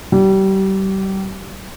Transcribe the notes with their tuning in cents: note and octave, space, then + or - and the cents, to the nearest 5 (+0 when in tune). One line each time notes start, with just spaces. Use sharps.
G3 -30